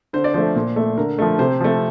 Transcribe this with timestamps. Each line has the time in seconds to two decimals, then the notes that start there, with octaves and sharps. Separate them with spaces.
0.13 D3 C5
0.24 D5
0.34 F3 A3 C5
0.56 A#2
0.76 A3
0.98 D3 A#4
1.19 F3 A3
1.39 C3 C5
1.60 F3 A3